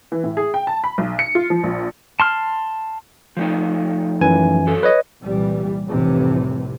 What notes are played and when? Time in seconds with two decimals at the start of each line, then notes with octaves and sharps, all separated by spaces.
0.12 E3
0.24 A2
0.37 G#4
0.54 G5
0.67 A5
0.84 B5
0.98 B1
1.19 C#7
1.35 F4
1.50 F3
1.64 A#1
2.20 A5 C6 F6
3.37 F3 A3 D#4
4.21 F#2 E3 G#5
4.67 F#3 A4
4.83 B4 C#5 D#5
5.23 C2 A#2 E3 G3
5.89 F1 C2 A2 C3 E3